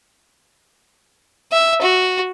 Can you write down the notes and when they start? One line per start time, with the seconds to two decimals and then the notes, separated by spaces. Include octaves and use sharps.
1.52 E5
1.82 F#4